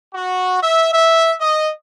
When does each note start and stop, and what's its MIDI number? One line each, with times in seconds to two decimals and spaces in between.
0.13 0.60 66
0.62 0.89 76
0.91 1.32 76
1.40 1.72 75